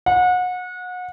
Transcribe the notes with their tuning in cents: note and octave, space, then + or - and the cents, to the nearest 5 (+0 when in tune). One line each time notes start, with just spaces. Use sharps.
F#5 -30